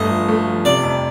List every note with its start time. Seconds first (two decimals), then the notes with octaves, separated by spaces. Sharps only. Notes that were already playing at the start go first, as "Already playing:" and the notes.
Already playing: G1 A3 D#5
0.10 F3
0.28 A3
0.47 F3
0.65 C3 D5
0.83 F2